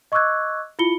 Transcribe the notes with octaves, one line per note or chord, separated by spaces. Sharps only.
D#5 C#6 D6 E6 F#6 G#6
E4 F4 B5 C#7 G7